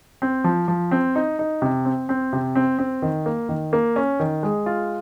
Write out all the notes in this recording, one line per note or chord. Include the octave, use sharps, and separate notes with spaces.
C4
F3
F3
C4
D#4
D#4
C3
C4
C4
C3
C4
C4
D#3
A#3
D#3
A#3
C#4
D#3
G#3
F4